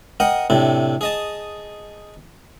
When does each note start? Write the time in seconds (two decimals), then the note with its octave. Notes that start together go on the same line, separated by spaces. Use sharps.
0.20 A#4 D#5 F#5 G5
0.50 A2 C3 D4
1.01 G#4 D#5 A5